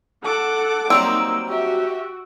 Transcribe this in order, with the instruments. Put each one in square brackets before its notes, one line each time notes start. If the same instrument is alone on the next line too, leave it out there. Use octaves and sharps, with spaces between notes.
[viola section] A4 F#5 [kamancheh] D6
[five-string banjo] F#3 G3 C4 [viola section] A#3 D#4 C5 [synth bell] E6 D7
[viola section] F#4 [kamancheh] G4 E5